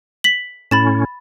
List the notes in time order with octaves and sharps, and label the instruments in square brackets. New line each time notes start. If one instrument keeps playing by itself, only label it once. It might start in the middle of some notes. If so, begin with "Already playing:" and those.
[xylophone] B6 F#7
[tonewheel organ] A2 C#4 [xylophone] B5 A6 E7